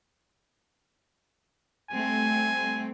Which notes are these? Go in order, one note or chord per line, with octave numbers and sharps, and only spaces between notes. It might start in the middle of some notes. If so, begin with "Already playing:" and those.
G3 A3 C4 G#5